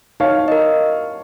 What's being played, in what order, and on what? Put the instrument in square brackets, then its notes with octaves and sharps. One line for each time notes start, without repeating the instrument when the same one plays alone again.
[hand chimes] D#4 [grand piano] C#5 F5
[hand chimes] A#4 D#5